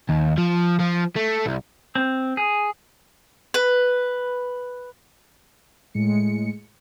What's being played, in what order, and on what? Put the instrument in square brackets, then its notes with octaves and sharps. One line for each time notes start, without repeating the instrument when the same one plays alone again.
[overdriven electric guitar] D#2
F3
F3
A3
C2
[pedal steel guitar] C4
G#4
[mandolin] B4
[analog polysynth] A2 G#3 C#7